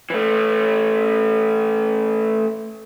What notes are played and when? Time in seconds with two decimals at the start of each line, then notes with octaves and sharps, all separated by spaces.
0.10 E3 A3